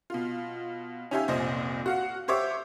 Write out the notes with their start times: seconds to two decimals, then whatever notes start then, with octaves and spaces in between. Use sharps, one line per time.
0.10 B2 F4
1.11 C#4 D#4 G4 E5 F5 G#5
1.28 F1 C2 A#2 C5 D#5
1.86 F#4 F5 F#5
2.28 G4 C5 C#5 E5 D6